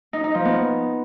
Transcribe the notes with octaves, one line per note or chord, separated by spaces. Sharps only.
D#4
D#4
F3
B3